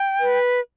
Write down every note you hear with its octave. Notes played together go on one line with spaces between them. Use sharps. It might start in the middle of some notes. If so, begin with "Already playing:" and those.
Already playing: G5
B4